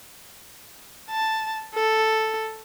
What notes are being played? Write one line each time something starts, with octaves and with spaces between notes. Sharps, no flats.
A5
A4